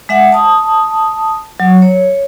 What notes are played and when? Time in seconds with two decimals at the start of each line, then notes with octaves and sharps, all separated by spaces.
0.09 G#3 E5 F#5
0.32 A5 D#6
1.60 F#3
1.82 C#5